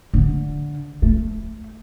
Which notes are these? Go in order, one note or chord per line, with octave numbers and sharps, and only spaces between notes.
D3
A3